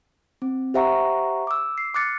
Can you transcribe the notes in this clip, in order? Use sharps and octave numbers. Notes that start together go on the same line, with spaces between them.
C4
G4 C5 E5 F#5 A#5 C#6
D6 E6
C7
D6 F6 F#6 A6 C#7